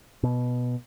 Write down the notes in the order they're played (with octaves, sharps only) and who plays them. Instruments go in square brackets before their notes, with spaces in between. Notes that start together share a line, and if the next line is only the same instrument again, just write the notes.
[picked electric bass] B2